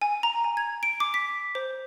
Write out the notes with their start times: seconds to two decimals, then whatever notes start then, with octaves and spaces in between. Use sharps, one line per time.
0.02 G#5
0.23 A#5
0.44 G#5
0.57 G#6
0.83 D7
1.00 D6
1.14 B6
1.55 C5